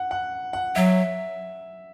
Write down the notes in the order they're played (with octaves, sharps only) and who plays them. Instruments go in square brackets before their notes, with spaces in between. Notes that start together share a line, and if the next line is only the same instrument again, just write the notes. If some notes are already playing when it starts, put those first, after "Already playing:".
Already playing: [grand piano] F#5
F#5
F#5
[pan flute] F#3 [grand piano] E5